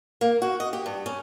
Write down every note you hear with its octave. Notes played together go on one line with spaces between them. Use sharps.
A#3
F#4
D#5
G4
G2
C#4